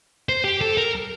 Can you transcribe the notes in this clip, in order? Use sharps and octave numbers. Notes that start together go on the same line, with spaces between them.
C5
G4
A4
A#4